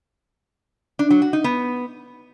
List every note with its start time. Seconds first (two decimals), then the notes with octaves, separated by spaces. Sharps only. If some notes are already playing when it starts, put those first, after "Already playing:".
0.99 D4
1.10 F#3
1.22 F#4
1.33 D#4
1.44 B3